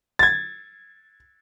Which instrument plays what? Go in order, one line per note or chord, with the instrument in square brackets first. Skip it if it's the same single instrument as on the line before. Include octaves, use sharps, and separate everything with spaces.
[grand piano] G#6 A6